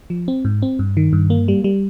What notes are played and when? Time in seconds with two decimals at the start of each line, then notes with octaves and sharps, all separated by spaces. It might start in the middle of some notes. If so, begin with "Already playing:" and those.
0.10 F3
0.28 C4
0.45 G#2
0.62 C4
0.79 G2
0.97 D#3
1.13 G2
1.30 A#3
1.48 G3
1.64 G3